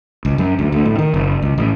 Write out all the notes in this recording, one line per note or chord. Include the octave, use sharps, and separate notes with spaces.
C#2
F#2
D2
D2
A2
D#3
F#1
C#2
A1